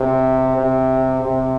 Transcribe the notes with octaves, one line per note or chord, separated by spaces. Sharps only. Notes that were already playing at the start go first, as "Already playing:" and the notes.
Already playing: C3
C3
C3